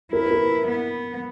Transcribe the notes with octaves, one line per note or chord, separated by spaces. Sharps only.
E4 A#4
B4
A#4
B3